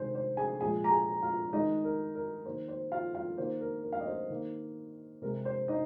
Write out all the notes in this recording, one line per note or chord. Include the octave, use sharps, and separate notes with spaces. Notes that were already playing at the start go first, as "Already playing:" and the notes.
Already playing: C3 D#3 G#3 C5
C5
G#4 G#5
A#2 F3 G#3 G#4 G#5
A#5
G#4 G#5
F4 F5
D#3 G#3 D#4 D#5
A#4
A#4
D#3 A#3 C5
C5
F4 F5
F4 F5
D#3 A#3 C5
A#4
A#4
F5
D#5
C5
D#3 A#3
C3 G#3 A#4
C5
D#4 D#5